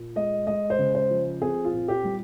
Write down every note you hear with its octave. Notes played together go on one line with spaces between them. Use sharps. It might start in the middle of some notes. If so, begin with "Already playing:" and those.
Already playing: A#2
G#3 D#5
G#3 D#5
C5
C#3
C5
F3
C4 G#4
F4
A#2
G4
G3